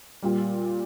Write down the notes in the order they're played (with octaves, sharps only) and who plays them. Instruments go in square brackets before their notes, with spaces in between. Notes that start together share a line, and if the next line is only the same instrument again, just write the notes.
[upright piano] A#2 G3